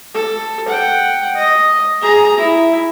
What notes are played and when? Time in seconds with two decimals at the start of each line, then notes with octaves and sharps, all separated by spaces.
0.14 A4
0.69 F#5 G5
1.35 D#5
2.01 G#4 A#5
2.37 E4